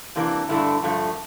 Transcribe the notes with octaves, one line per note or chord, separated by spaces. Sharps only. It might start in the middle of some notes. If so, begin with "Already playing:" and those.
C3 E3 A#3 D4
G2 D3 A3 D4 E4
G2 D3 F3 A3